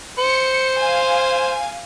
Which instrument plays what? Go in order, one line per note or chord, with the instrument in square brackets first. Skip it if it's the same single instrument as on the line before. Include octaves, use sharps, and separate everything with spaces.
[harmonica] C5 [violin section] C#7
[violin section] F5 G#5